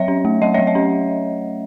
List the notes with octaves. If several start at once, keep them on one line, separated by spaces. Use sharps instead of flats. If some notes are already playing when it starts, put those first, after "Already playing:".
Already playing: F#3 C#5 E5
C#4
A3
F#3 D#5 F#5
F#3 C#5 E5
D#5
C#4